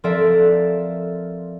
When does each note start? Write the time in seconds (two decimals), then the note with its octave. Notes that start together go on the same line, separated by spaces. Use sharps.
0.04 F3 C4 A4 A#4 D5 E5